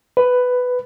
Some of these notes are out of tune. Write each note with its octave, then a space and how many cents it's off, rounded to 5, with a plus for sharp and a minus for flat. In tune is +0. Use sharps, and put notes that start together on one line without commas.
B4 +10